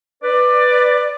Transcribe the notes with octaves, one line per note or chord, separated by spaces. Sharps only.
B4 D5